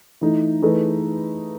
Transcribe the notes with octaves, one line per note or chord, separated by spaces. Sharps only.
E3 A3 D#4
E3 A3 D#4 G#4 B4